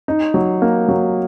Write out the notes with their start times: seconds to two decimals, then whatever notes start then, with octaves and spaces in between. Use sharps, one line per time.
0.08 D#4
0.34 F#3
0.62 A#3
0.88 F#3